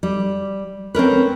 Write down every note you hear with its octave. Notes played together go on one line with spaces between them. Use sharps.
G3
C4 C#4 A#4 B4